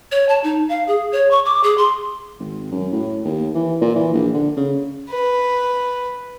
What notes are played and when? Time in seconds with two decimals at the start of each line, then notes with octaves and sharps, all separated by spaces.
0.12 C#5
0.29 A5
0.44 D#4
0.69 F5
0.88 G#4
1.12 C#5
1.31 C#6
1.45 D6
1.64 G#4
1.78 C6
2.40 G#1
2.71 F#2
2.92 A2
3.25 D#2
3.55 E3
3.81 A#2
3.95 E3
4.14 A#1
4.34 D3
4.57 C#3
5.10 B4